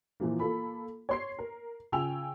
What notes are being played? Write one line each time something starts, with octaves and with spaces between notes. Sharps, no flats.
A#2 E3 F3 A#3
A#3 F4 A4 B5
C#5 C6 C7
A#4
C#3 F4 G5 G#5 E6 F7